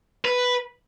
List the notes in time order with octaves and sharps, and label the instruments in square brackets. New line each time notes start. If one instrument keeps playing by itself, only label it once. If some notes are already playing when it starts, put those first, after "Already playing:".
[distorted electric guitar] B4